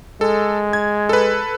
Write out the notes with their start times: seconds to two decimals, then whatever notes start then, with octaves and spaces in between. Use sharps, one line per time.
0.21 G#3 A4
0.73 G#6
1.09 A4 B4